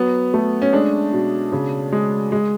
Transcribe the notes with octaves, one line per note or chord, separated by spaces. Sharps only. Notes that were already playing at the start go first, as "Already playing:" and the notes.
Already playing: F#3 B3
A3
C#4
G#3 D4
B2
C#3
G#3
G#3